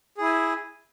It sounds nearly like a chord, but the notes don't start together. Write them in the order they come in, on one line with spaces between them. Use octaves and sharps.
G#4 E4 G#5